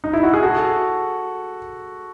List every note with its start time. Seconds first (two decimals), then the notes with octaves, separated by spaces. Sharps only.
0.04 D#4
0.13 E4
0.23 F#4
0.34 G#4
0.43 F#4 A4